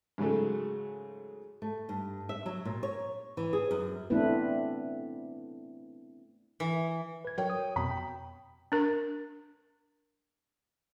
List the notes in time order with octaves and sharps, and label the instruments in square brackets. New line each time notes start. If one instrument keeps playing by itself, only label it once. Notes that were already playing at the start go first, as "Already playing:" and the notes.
[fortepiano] G#2 C#3 F#3 G#3 A3
[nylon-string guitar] A3
G2
E5
F#3
A#2
C#5
E3
G#4
F#2
[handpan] A3 B3 C4 D4 E4 B4
[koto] E3
[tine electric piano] B4 G#6
[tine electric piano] F#3 A#4 [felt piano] C#5 G5
[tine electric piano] D#6
[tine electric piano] F2 B2 [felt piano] B5
[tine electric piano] G5
[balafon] D4 A#4